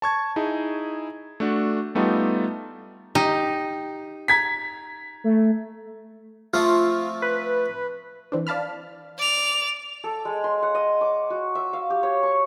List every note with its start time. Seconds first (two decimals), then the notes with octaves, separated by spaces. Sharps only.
0.02 A5 C#6 G#6
0.36 D#4 E4 G#4
1.40 A3 D4 F#4
1.95 G3 A3 B3 D#4 F4 G4
3.15 D#4 G4
4.28 A#5 G#6 B6
5.24 A3
6.53 F3 A3 C4 F4
7.22 B4
8.32 E3 C4 D4
8.47 D5 F5 A5 B5 F6
9.18 D5 F7
10.04 A4
10.25 G#3
10.44 C6
10.63 F#5
10.75 D#5
11.01 D6
11.30 F#4
11.55 E5
11.73 F5
11.90 G4
12.03 C#5
12.23 C#6